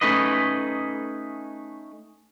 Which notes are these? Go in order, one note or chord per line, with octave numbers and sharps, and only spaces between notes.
A3 C#4 D#4 B4 D#5